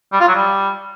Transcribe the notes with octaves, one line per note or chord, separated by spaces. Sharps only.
G3
F4
F#3
G3